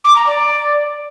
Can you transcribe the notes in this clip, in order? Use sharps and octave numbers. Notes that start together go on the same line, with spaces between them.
D6
A#5
D5